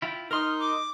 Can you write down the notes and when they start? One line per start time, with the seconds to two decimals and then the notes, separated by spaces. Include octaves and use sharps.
0.02 E4 F4 G5
0.31 D#4 A#4 C6 D#6 F6
0.59 D6